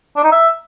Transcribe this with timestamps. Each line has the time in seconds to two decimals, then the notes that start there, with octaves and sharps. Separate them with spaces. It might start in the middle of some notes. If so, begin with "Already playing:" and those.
0.16 D4
0.24 D#4
0.32 E5